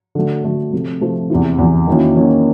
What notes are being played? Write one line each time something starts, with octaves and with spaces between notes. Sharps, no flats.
D3 F#3 A3
D3 F#3 A3
C3 F3 A3
C3 F3 A3
E2 C3 E3
E2 C3 E3
D#3 F#3 A#3 C#4 E4
D#3 F#3 A#3 C#4 E4